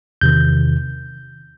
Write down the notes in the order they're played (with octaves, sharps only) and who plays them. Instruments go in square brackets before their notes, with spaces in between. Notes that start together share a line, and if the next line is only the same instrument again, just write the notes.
[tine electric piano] E2 C3 D#3 G6